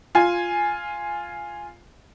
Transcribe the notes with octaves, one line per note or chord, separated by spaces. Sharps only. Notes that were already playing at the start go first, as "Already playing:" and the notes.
F4 G#5